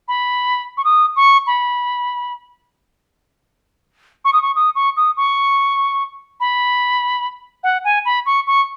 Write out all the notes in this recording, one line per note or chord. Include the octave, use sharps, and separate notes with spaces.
B5
C#6
D#6
C#6
B5
C#6
D#6
C#6
D#6
C#6
D#6
C#6
B5
F#5
G#5
B5
C#6
C#6